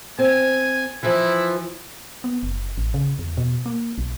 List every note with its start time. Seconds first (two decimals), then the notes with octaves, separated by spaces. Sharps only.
0.19 C4 G#5
1.03 E3 F3 E4
2.24 B3
2.43 F#1
2.77 A1
2.94 C#3
3.19 E2
3.37 B2
3.66 A#3
3.98 B1